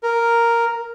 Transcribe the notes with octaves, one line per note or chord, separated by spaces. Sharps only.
A#4